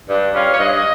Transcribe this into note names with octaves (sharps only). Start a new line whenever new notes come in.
G2
G3 C#4 F4
C#5
G2 D#5